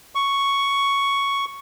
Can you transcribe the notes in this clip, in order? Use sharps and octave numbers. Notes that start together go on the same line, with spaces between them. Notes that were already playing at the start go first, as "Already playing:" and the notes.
C#6